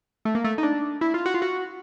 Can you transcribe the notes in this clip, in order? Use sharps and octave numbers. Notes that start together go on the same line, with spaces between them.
A3
A#3
A3
D#4
D4
E4
F4
F#4
F4
F#4